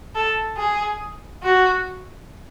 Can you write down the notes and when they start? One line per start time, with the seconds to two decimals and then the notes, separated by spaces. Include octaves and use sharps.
0.15 A4
0.57 G#4
1.43 F#4